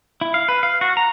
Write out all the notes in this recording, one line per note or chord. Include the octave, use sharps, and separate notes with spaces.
E4
F5
B4
F5
F#4
A#5